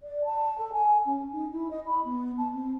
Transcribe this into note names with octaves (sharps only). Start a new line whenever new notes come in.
D5
A5
A4
G#5
C#4
D#4
E4
D#5
B5
B3
A5
C4